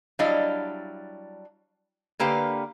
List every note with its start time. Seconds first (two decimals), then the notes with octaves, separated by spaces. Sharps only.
0.19 F#3 G3 D4 E4 D#5 F5
2.20 D3 A#3 G4 B4 F5